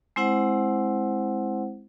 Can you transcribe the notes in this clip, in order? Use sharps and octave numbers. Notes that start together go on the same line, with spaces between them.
G#3 C4 E4 C5 F#5